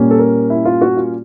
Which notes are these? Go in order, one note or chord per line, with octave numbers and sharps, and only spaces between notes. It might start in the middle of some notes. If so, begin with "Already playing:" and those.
Already playing: A#2 G3 A#3 C#4
A4
A#4
E4
F4
F#4
F4